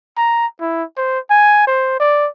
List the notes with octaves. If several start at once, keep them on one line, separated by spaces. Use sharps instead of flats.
A#5
E4
C5
G#5
C5
D5